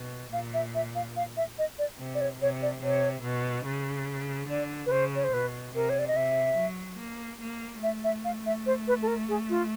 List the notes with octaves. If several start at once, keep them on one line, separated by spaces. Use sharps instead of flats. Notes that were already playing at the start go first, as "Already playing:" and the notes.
Already playing: B2
A#2 F5
E5
E5
F5
F5
E5
D#5
D5
C3
D5
C#5
C3 C#5
D5
C3 C#5
B2
C#3
D3 D5
B4
C#3 C5
C#5
C5
B2 B4
C3 A#4
C#5
D5
D#5
C3 E5
F#3
A#3
A#3
A3 E5
E5
F5
E5
C5
B4
A4
A#4
G#4
F4